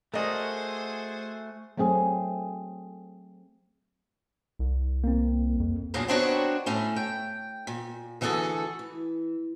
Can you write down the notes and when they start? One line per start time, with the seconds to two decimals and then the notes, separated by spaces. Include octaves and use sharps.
0.14 A3 F#4 G#4 A#4 C5 D#5
1.77 F#3 A3 C4 G#4
4.59 C2
5.04 A#3 C4
5.60 F2
5.94 E2 G2 A#2 F#3 D4 G#4
6.08 B3 C4 D4 D#4 F#4 C#5
6.66 A2 A3 C#4
6.96 G5
7.67 A#2
8.21 D2 E3 F#4 G#4 A4
8.79 E3